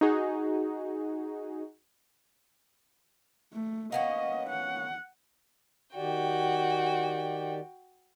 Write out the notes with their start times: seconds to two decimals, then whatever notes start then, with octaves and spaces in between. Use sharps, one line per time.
0.01 D#4 F#4 G#4
3.53 A3
3.92 A#3 B3 C#4 D#5
4.49 F#5
5.96 D#3 F#4 G4 D5 G5